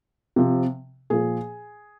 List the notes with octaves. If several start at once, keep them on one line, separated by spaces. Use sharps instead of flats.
C3 F3
A#2 F3 G#4